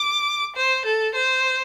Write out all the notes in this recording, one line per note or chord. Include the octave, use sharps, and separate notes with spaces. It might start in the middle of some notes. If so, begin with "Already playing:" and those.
Already playing: D6
C5
A4
C5